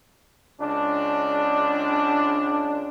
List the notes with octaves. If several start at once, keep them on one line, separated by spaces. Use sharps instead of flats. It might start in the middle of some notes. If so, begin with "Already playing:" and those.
C#2 D4